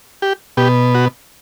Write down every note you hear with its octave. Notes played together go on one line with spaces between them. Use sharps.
G4
B2 G4
F#4